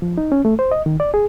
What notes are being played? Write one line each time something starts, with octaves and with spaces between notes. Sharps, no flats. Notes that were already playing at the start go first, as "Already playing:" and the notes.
F3
D#4
C#4
A3
C5
D#5
D#3
D5
G#4